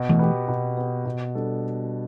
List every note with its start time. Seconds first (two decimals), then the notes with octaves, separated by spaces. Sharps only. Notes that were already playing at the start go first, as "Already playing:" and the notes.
Already playing: B2
0.09 E3 A3
0.19 B3 G4
0.48 B2
0.77 B3 G4
1.06 B2
1.35 G3 D4 A4